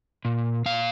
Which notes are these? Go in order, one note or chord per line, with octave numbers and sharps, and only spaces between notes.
A#2
A#2 F5